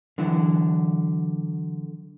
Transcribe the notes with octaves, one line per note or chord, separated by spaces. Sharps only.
D3 E3 F#3 E4